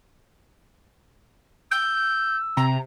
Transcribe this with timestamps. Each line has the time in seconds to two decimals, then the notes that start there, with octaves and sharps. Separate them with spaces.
1.71 E6 G6
2.57 C3 A#5